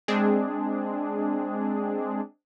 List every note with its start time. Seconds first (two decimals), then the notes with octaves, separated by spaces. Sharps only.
0.08 G#3 C4 D4 G#4